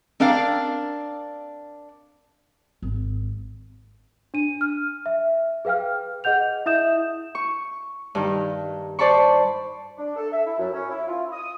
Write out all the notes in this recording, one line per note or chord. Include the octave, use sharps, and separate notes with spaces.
C4 D4 A#4 D5 F5 G5
G#1
D4 D#7
F6
E5
G#4 B4 F5 G5 F6
G#4 D#5 F#5 G6 F7
E4 E5 D#6 G6 E7
C#6
G2 D#3
C5 D5 A5 B5 C#6
D4
A4
E5
E4
F#2
C#4
E4
F4
D#6